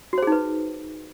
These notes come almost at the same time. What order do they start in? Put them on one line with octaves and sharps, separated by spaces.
F#4 C5 G#4 D#4 B4